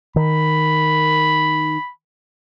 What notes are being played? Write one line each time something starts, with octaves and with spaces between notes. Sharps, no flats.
D#3 B5